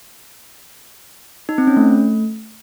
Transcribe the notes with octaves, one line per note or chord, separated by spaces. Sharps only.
D#4
C4
C#4
A3